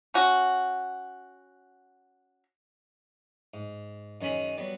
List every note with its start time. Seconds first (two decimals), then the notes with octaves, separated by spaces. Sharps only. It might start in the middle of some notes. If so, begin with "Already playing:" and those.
0.14 C#4 F#4
3.54 G#2
4.21 F#2 D#3 G#3 C#4 B5
4.58 F#3 G3 B3